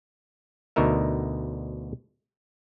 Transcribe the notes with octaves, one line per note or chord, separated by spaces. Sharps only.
D2 B2 D3 D#4 A#4 E5